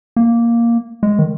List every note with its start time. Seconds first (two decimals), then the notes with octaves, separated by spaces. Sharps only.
0.16 A#3
1.03 G#3
1.19 D#3